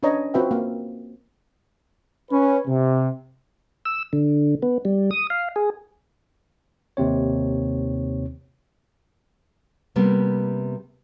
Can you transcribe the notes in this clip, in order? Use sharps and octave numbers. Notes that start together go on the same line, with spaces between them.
C#4 D4 B4 C#5 D#5 A#5
C4 F4 F#4 B4 E5 G5
A#3 F5
C#4 B4
C3
E6
D3
B3
G3
D#6
F5
G#4
D#2 C3 C4 C#5
C3 G3 A#3 B3